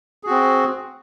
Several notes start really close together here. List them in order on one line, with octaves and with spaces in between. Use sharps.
G#4 F#4 C4